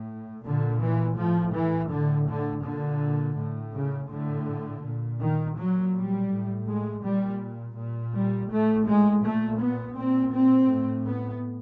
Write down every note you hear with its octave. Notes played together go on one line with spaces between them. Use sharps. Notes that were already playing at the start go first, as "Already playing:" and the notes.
Already playing: A2
A#2 D3
E3
A2 F3
E3
A2 D3
D3
A#2 D3
A2
C#3
A2 D3
A#2
D#3
A#2 F#3
G3
A2
G#3
A#2 G3
A#2
G3
A2 A3
G#3
A#2 A3
B3
A#2 C4
C4
A2
B3